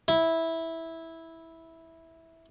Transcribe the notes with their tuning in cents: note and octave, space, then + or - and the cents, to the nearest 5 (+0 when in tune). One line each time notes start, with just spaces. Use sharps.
E4 -10